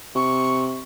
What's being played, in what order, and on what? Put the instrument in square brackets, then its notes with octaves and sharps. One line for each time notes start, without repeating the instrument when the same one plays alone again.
[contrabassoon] C3 [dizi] C#6